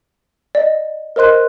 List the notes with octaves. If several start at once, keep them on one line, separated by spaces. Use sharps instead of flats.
D5 D#5
A#4 C5 D#5 C6 F#6